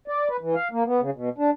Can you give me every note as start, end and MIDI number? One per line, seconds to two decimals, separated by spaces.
0.08 0.28 74
0.29 0.37 71
0.41 0.55 52
0.55 0.68 77
0.72 0.84 58
0.86 1.01 59
1.01 1.10 49
1.15 1.29 47
1.38 1.50 62